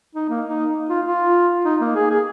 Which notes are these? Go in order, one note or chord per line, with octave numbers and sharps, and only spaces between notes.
D#4
A#3
D#4
F4
F4
D#4
A#3
G#4
G#4